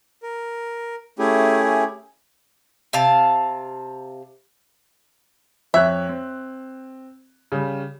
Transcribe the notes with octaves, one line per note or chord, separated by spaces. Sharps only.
A#4
A3 C#4 E4 G4 G#4
C3 F5 A5
F2 C#5 E5 F#6
C4
C#3 G3